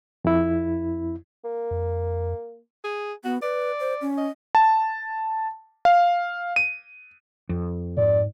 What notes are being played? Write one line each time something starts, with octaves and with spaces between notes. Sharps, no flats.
F2 E4
A#3
F2
G#4
B3 F#4
B4 D5
C5
C#4
D#5
A5
F5
D#7
F2
G#2 D5